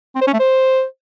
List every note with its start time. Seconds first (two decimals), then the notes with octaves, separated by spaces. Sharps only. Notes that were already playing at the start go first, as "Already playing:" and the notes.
0.15 C4
0.21 C5
0.27 C#4
0.33 A3
0.39 C5